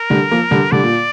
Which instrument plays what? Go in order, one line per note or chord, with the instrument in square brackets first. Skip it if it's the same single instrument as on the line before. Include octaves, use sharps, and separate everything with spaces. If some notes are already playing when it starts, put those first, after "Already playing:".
Already playing: [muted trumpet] A#4
[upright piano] D3 G3
F3 A#3
D3 G3
[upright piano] D3 G3 [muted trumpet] D5
[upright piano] A#2